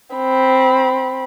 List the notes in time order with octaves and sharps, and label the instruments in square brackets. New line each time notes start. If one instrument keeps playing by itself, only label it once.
[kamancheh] C4 B5